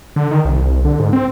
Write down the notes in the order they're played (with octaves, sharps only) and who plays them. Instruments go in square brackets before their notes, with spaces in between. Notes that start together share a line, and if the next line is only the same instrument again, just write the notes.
[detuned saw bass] D3
D#3
C2
D3
G#2
C4